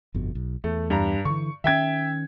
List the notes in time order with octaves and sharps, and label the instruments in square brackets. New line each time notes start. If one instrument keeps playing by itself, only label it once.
[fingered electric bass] G1 F2 B2
B1
[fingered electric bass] E2 [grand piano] A3
[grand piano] G2 A#5
[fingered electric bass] D3 E3 [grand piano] C#6
[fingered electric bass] D#3 C#4 [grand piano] E5 G5 G#6